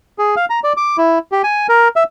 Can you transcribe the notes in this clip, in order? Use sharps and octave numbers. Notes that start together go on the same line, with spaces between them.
G#4
F5
A#5
D5
D6
E4
G4
G#5
A#4
E5